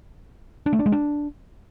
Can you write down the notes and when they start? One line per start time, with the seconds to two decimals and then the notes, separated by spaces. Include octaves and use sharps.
0.66 D4
0.73 A3
0.79 D4
0.86 G#3
0.92 D4